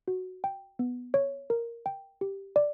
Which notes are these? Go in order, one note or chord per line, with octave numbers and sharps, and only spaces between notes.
F#4
G5
B3
C#5
A#4
G5
G4
D5